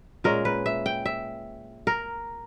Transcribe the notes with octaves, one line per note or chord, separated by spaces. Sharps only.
A#2 G#3 C#4 A#4
B4
E5
G5
E5
A#4